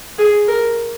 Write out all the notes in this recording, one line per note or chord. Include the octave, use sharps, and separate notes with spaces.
G#4
A#4